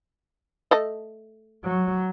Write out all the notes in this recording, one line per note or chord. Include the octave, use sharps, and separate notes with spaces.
A3 A4 D#5
F#3